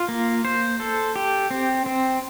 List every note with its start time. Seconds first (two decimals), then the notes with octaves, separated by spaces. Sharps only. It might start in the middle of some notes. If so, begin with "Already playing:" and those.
Already playing: F4
0.09 A#3
0.45 C5
0.80 A4
1.16 G4
1.51 C4
1.86 C4